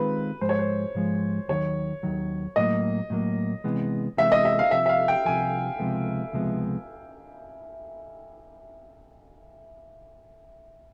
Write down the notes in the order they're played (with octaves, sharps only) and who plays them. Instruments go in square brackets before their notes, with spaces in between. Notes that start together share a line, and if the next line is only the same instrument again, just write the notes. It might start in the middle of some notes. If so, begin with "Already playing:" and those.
Already playing: [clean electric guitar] D#3 G#3 C4 F4 [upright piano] B4
[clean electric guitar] G#2 F3 G#3 [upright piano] C5
[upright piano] C#5
C5
[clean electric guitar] G#2 F3 G#3
[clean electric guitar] D#2 D#3 F#3 [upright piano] C#5
[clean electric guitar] D#2 D#3 F#3
[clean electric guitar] A2 F#3 A#3 [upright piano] D#5
[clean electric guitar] A2 F#3 A#3
C3 E3 G#3 B3
[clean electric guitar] C3 E3 G#3 B3 [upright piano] E5
[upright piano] D#5
E5
F5
[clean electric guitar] C2 C3 F3 [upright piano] E5
[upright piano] E5
F5
G5
[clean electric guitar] C2 C3 F3 [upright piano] G#5
[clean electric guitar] C#2 C3 F3 G#3 B3
C#2 C3 F3 G#3 B3